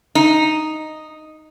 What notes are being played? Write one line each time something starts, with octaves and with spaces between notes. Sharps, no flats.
D#4